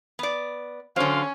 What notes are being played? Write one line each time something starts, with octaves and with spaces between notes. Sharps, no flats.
B3 D5
D3 F#3 C#4 C5 F5